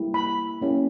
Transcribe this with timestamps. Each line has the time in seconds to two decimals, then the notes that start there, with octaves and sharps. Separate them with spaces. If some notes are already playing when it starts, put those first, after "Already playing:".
Already playing: G3 A#3 E4 G4
0.14 B5
0.62 A#3 C#4 E4 G4